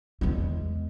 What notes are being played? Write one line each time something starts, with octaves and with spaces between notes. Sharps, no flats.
E2 G#3